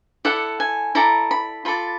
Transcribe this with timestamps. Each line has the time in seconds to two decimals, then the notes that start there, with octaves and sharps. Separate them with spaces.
0.25 E4 A4 D5 F#5
0.60 G#5
0.95 E4 A4 D5 A#5
1.31 B5
1.65 F4 A4 D5 B5